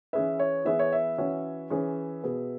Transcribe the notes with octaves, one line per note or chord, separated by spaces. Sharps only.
E3 C#4 G#4 B4 E5
C#5
E3 B3 G#4 B4 E5
C#5
E5
E3 C#4 F#4 C#5
E3 C#4 G#4 C#5
B2 B3 G#4